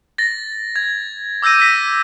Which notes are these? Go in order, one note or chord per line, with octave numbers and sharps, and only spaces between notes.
A6 A#6
G#6
D6 E6 G6 A#6 D#7
A#6 B6